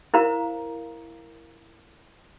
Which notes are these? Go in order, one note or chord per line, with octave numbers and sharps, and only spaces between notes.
E4 A#4 C5 F5 A#5